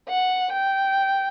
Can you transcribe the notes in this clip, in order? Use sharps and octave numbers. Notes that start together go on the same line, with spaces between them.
F#5
G5